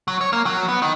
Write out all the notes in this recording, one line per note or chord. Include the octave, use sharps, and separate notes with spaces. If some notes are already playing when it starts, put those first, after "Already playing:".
F#3
C#5
A#3
F#3
B3
D#3